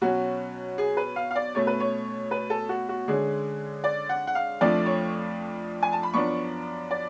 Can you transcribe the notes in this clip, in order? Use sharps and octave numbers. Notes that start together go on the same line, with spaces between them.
B2 F#3 C#4 F#4
G#4
B4
F5
F5
D5
B2 A3 C#4 C#5
B4
C#5
B4
A4
F#4
F#4
D3 G#3 C#4 G#4
D5
F#5
F#5
F5
F2 F3 A3 D4 D5
C#5
G#5
A5
B5
F#2 F3 B3 D4 C#6
D5